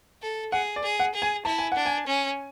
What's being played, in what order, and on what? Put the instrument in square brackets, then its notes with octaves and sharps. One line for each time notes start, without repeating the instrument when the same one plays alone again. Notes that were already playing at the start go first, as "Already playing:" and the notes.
[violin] A4
[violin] G#4 [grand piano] F#5
[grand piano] D5
[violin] G#4
[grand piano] F#5
[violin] G#4
[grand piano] G#5
[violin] E4 [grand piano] A5
[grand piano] G#5
[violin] D4 [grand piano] F#5
[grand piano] G#5
[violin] C#4